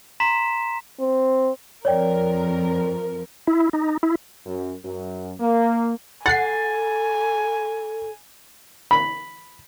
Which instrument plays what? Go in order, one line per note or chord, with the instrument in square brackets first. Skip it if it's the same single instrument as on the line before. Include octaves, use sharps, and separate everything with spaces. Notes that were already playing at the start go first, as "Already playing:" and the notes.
[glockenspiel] A#5 C6 B6 E7
[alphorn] C4
[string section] F2 A#4 [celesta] C#5 D5 G5
[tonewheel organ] E4
D#4
E4
[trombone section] F#2
F#2
A#3
[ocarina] A4 [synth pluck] F#5 C7 [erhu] G#5 [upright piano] A6
[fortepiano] B5